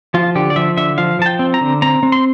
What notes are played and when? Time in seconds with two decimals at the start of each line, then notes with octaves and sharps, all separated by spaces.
0.14 F3 F4
0.35 D3 G4
0.50 D5
0.56 F3 E5
0.77 D3 E5
0.98 F3 F5
1.19 F3 A5
1.26 G5
1.39 C4
1.54 A#5
1.61 D3
1.82 C4 A#5
2.03 C4
2.12 C6